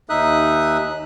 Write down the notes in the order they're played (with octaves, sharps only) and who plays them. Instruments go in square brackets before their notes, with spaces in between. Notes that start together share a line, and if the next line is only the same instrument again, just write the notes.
[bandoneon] D#2 D#4 E5 D#6 F#6